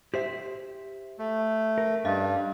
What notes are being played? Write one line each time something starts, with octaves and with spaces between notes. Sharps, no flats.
G4 C5 E5 C6
A3
A#4
G2 C#4 D#5 F5